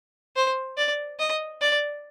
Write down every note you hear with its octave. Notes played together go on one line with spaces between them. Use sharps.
C5
D5
D#5
D5